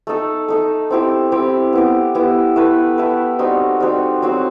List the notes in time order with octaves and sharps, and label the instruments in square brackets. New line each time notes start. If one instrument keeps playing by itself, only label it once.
[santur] A3 D#4 A4
A3 D#4 A4
C4 E4 G4
C4 E4 G4
B3 E4 G4
B3 E4 G4
A3 E4 B4
A3 E4 B4
G3 C4 D#4 F#4
G3 C4 D#4 F#4
F#3 C4 F#4 C5